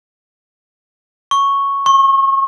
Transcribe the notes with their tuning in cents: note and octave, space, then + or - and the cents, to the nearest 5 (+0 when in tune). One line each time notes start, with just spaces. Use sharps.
C#6 +0
C#6 -35